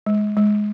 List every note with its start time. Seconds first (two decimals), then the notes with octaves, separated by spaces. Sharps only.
0.06 G#3
0.37 G#3